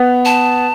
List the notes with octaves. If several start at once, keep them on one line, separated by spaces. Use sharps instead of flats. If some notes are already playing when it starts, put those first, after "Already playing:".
Already playing: B3
A5